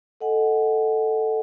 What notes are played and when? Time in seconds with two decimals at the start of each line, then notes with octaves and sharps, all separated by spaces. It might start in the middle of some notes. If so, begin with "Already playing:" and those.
0.21 A4 D#5 F#5 G#5